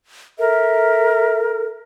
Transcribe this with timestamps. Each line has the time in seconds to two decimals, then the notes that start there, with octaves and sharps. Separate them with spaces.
0.39 A4 A#4 E5